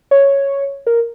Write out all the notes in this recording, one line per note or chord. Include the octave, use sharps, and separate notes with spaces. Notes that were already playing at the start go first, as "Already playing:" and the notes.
C#5
A#4